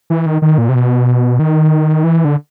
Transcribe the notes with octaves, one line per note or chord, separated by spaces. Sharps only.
E3
D#3
D#3
A#2
C3
B2
D#3
E3
D3